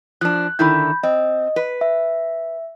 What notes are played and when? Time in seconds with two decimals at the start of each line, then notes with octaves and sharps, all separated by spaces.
0.21 F3 D4 F#6
0.59 D3 D#3 E4 B5 G6
1.03 C4 D#5
1.56 B4
1.81 E5